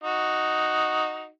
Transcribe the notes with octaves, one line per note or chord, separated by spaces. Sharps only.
D#4 F#4